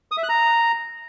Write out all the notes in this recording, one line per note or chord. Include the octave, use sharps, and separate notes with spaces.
D#6
E5
F#6
A#5